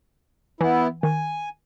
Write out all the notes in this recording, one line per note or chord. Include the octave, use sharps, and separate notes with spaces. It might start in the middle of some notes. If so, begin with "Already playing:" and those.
E3 B3 E4
D#3 G#5